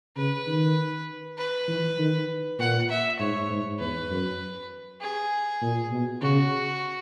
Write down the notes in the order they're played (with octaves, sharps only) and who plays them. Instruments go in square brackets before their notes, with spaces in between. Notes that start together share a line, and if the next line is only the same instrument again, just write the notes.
[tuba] C#3 [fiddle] B4
[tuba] D#3
[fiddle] B4
[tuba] E3
D#3
[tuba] A#2 [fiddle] F#5
[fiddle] E5
[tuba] G#2 [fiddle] C#5
[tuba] G#2
[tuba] E2 [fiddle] B4
[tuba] F#2
[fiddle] G#4
[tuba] A#2
B2
[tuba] C#3 [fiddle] F#4